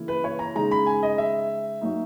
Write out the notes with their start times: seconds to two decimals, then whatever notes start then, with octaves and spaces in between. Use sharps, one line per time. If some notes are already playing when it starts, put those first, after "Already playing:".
Already playing: C#3 E3 A#3 E4
0.08 B4
0.24 C#5
0.39 A#5
0.55 C#3 G#3 D#4 A#5
0.71 B5
0.86 G#5
1.03 D#5
1.18 E5
1.81 F#3 A#3 D#4